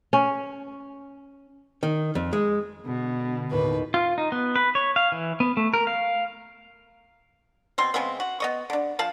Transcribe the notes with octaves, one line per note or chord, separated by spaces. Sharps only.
C#4
D#3
F2
G#3
B2 D3
D#2 A2 B4
F4
D#4
B3
B4
C#5
F5
E3
B3
A3
A#4
F5
B2 C4 C6
C#3 G#3 B3 C4
F#4
B3 D#5 C#6
D3 D4
F3 F5 A5